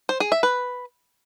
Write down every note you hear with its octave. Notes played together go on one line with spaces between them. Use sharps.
C5
G#4
E5
B4